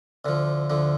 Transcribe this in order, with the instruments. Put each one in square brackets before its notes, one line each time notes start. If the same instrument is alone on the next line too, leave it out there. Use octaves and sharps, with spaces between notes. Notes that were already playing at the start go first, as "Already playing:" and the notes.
[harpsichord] D2 D3 F3
D2 D3 F3